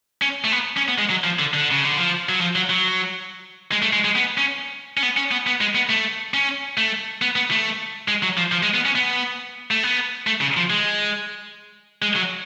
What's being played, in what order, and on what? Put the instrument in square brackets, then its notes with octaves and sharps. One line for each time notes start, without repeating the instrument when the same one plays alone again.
[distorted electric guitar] C#4
A3
B3
C#4
B3
G#3
F#3
F3
D3
D3
C#3
D3
F3
F#3
F3
F#3
F#3
G#3
A3
G#3
G#3
B3
C#4
C#4
B3
C#4
B3
B3
G#3
B3
A3
C#4
A3
B3
B3
A3
G#3
F#3
F3
F3
G#3
B3
C#4
B3
A3
B3
A3
C#3
F3
G#3
G#3
F#3